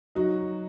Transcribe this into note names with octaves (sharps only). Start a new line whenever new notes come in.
F#3 D#4 F#4